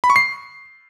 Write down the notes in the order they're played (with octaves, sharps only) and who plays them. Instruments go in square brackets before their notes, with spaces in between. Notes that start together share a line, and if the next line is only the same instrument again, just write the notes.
[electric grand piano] B5
C#6
C7